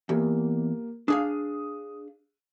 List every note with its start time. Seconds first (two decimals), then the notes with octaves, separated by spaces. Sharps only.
0.09 E2 A#3 G4
1.08 D4 G#4 F5 D#6